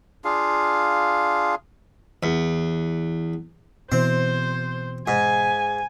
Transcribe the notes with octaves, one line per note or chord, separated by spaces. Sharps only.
D4 F4 G#4 F5
E2
B2 E3 C4 C5
G#2 G#5